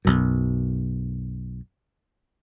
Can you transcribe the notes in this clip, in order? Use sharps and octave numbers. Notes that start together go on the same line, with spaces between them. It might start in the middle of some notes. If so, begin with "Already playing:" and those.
B1 F#2